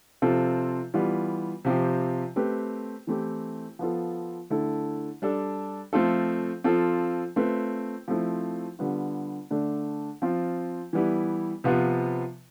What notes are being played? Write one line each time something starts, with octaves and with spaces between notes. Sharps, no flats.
C3 F3 C4 F4 A4
E3 G3 B3 F4
C3 F3 C4 G4
A3 C4 G4 B4
E3 A3 C4 E4 G4
F3 B3 F4 A4
D3 A3 E4 A4
G3 D4 A4
F3 A3 C4 F4 A4
F3 C4 F4 A4
A3 C4 F4 B4
F3 A3 C4 E4
D3 G3 B3 F4
D3 A3 D4
F3 C4 F4
E3 G3 B3 E4
C3 F3 B3 F4 B4